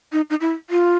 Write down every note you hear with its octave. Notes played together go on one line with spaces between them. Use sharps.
D#4
D#4
E4
F4